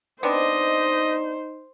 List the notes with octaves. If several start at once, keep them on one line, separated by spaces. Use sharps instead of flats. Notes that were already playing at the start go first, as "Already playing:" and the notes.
B3 C4 D4 D#4 C5 D#5